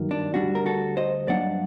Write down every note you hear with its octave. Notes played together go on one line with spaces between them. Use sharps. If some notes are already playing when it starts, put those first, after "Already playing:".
Already playing: G2 D#3 F#3 A#3
D4
D2 D3 G3 D4 F#4
A#4
F#4 A4
C5 D#5
G2 F#3 A#3 D4 D5 F#5